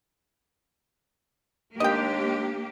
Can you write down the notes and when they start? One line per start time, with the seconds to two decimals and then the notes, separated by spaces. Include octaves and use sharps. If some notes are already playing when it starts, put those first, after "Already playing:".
1.80 D#2 G#3 A#3 D4 G4 D#5 G5